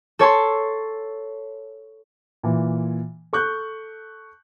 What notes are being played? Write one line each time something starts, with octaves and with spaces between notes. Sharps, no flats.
A4 C#5 A5 C6
A#2 E3
A4 C#6 F#6 G6